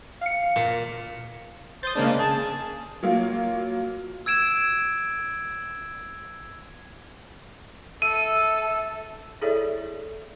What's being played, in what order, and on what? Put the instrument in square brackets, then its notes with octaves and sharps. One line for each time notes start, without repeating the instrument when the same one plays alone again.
[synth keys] F5 C#7
[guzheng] A#2
[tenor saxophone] C5 [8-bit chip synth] D#6 G6 A6
[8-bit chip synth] C#3 A#3 D4 [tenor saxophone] G#3
[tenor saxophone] G#4 [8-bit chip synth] A5
[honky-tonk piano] F#3 A#3 F4
[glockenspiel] E6 G#6 D7 E7
[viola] A4 [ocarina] E5 [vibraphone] E6 [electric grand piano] D#7
[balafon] E4 G#4 A4 C#5 D5 E5